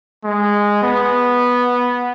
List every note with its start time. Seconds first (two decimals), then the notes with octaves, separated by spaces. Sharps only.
0.25 G#3
0.83 B3